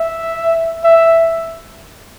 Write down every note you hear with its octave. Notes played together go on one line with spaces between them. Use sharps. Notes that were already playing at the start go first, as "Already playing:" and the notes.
Already playing: E5
E5